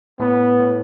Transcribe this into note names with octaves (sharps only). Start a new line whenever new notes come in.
A2 B3
A2